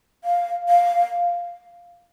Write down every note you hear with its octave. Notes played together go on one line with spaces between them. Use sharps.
F5
F5